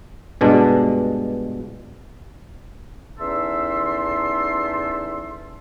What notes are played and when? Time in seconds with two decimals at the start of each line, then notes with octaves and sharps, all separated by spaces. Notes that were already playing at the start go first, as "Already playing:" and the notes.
0.41 G2 B2 G#3 D4
3.18 E2 C#4 D#4 A4 E5 C6